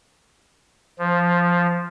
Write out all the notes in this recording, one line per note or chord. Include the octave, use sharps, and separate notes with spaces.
F3